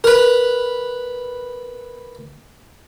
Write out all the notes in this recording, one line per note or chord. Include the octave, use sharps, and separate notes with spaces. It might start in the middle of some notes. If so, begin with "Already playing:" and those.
A#4 B4